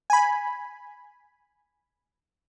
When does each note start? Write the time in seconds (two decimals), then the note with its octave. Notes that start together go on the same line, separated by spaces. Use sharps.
0.10 G#5 B5